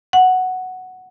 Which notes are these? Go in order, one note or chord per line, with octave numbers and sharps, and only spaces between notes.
F#5